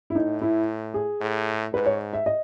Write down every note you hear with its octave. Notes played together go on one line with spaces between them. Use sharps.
E4
A2 D#4
E4
G#4
A2
G#2 B4
C#5
E5
D#5